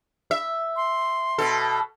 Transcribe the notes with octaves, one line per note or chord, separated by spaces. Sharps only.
E5
C6
B2 A4